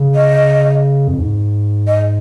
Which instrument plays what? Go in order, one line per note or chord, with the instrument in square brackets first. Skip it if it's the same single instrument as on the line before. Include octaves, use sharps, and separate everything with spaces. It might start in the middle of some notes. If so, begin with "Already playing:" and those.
Already playing: [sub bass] C#3
[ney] D#5
[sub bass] F2
G#2
[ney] D#5